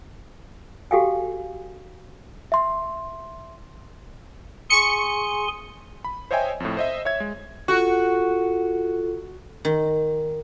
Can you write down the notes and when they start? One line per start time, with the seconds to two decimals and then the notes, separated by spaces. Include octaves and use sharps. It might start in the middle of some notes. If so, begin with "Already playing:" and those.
0.91 F#4 G4 A4 F5 G5 G#5
2.52 E5 C6
4.70 G#4 G#5 C6 C#6 C#7
6.04 B5
6.31 C5 C#5 D#5 E5 G5 G#5
6.60 F2 A2
6.77 C5 D#5 E5
7.05 C#5 E5 G#6
7.20 G#3
7.68 F4 F#4 A4
9.65 D#3